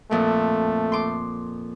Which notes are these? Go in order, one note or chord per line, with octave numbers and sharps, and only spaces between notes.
F2 A#2 A3
C6 D6